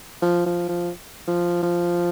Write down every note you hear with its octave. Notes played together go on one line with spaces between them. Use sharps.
F3
F3
F3
F3
F3